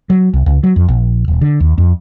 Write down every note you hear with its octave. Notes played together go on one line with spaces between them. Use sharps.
F#3
C2
C#2
F#3
F2
A#1
D#1
D3
D#2
F2